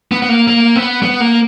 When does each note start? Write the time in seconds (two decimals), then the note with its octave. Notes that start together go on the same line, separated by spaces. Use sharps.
0.12 B3
0.22 B3
0.29 A#3
0.47 A#3
0.76 B3
1.03 B3
1.20 A#3